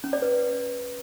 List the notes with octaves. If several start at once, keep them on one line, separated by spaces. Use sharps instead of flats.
C#4
D5
B4